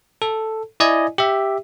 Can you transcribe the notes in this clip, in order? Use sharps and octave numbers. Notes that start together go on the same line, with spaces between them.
A4
E4 D5 D#5 G#5
G4 E5